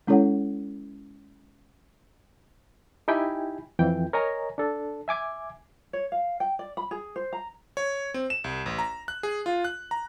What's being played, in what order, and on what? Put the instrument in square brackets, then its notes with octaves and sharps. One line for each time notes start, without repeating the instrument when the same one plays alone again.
[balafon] G#3 C#4 E4 A4 C#5 F#5
[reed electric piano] D#4 E4 G4 G5 G#5 B5
F2 E3 G5
A#4 C#5 D#5 G#5 A#5
D4 A4
E5 G#5 D6 G#6
[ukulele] C#5
F5
G5
D5
B5
G#4
C5
A#5
[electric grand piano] C#5
C4
E7
C2
A1
A#5
F#6
G#4
F4
F#6
A#5